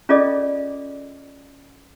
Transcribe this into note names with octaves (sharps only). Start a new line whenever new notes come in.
C#4 F4 G#4 A4 D5 D#5